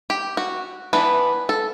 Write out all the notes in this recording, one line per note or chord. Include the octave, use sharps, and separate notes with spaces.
G4
F#4
E3 B3 D4 B4
A4